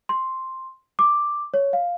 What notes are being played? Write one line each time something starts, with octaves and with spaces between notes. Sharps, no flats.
C6
D6
C#5
F5